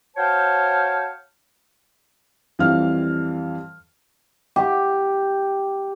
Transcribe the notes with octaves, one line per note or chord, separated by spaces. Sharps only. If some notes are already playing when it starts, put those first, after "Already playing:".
F#4 C5 C#5 F5 G5 A5
F2 E3 G3 F4 F5 F6
G4